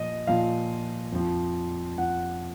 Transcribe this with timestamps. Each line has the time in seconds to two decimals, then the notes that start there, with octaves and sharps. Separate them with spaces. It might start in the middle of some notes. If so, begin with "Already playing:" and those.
Already playing: A#2 F3 D#5
0.27 A#2 F3 F5
1.12 F2 F3
1.97 F2 F3 F#5